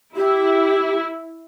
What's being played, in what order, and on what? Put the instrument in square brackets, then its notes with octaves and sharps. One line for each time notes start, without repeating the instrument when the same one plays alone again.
[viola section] E4 [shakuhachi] G4